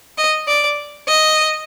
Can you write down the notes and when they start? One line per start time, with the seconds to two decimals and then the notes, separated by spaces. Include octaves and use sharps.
0.18 D#5
0.48 D5
1.08 D#5